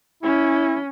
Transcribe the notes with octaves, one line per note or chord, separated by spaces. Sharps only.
C#4 E4